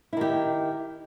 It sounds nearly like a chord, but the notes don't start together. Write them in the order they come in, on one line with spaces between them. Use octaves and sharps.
E4 D#3 G4